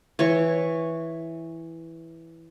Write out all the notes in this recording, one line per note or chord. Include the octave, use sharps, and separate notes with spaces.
E3 C#5 C#6